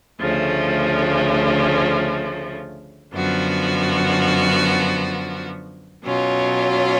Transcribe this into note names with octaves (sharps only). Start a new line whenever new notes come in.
D2 C#3 F3 A3
F#2 D3 F3 B3 F#4
B2 F#3 C#4 F4